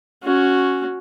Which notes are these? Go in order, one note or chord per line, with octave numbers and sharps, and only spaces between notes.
C#4 F#4